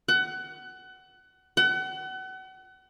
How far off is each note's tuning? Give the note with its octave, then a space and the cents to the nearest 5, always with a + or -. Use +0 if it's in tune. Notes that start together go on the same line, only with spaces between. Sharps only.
F#5 +25
F#5 +35